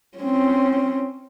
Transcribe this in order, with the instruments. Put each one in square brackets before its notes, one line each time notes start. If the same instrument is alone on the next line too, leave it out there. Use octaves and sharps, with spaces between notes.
[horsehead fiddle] C4 C#4